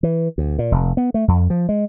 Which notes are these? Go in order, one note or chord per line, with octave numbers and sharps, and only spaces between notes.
E3
D2
A#2
F1
B3
A3
F2
F3
G#3